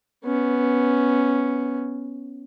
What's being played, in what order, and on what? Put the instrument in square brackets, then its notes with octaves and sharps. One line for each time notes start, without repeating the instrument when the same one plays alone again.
[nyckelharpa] B3 C#4